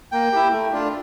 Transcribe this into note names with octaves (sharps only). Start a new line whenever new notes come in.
A#3 G5
E4 G4
A3
D4 F4